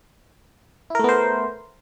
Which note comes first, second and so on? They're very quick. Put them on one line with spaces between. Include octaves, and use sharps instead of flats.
E4 A#4 A3 B3 C5